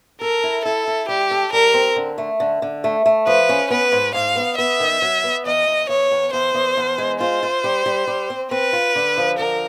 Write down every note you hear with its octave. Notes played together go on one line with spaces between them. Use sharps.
A4 A#4
E4
E4 A4
E4
G3 G4
A4
G3 A#4
C4
D3
A3
D3
D3
A3
A3
F3 B4
C#4
B3 B4
G#2
G#2 F5
B3
B3 E5
D#3
F#3
B3
E2 D#5
E2
E2 C#5
E2
E2 C5
E2
E2
G#3
F4 C5
F4
G3
G3
G3
C4
C4 B4
F4
D3
F3
D3 A#4